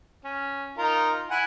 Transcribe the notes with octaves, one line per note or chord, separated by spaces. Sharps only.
C#4
D#4 F4 A#4
E4 F#5 G#5